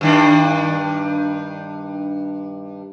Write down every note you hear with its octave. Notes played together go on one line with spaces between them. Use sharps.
G2 D#3 D4